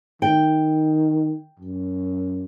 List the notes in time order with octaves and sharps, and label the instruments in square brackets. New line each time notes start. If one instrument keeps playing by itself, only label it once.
[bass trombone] D#3 [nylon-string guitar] G5
[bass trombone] F#2